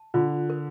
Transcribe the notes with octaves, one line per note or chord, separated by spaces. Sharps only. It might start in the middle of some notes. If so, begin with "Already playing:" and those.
Already playing: A5
D3 F4
A#4